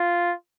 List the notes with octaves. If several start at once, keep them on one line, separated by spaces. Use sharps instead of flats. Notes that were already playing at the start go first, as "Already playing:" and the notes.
Already playing: F4